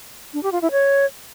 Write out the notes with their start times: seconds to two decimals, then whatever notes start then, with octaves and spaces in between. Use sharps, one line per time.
0.34 D4
0.43 G4
0.52 F4
0.62 E4
0.71 C#5